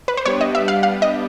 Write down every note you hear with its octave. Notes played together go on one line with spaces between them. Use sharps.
B4
C5
G3 B3 D4 G4 B4 C#5
D#5
E5
F5
F5
D#5